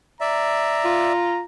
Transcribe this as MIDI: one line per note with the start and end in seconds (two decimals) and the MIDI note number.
0.21 1.13 74
0.21 1.13 76
0.21 1.44 82
0.84 1.43 65